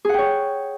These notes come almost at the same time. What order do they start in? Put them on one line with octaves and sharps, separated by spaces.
G#4 F#5 G5 C#5